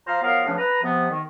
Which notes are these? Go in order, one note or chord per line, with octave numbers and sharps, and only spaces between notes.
F3 C5 F5 A#5
F3 F#3 B3 A#4 F5
E2 C#3 F3 A3 C#4 D4
B4 A#5
C3 F3 B3
D#3